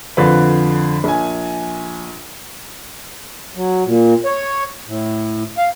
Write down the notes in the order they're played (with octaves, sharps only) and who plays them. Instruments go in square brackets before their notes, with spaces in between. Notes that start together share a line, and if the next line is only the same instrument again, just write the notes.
[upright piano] F2 D3 F4 B4
A#1 G#5
[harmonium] F#3
A#2
C#5
A2
F5